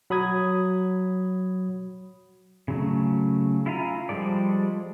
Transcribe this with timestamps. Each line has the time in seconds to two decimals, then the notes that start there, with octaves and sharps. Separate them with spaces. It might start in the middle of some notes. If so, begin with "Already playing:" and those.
0.10 F#3 B5 D#6 G#6
2.68 C#3 F#3 A3
3.66 E4 F4 F5 G#5 A#5
4.09 F3 G3 G#3 A4 D5